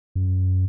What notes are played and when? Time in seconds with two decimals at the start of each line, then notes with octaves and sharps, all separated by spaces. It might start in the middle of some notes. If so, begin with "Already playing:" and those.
0.15 F#2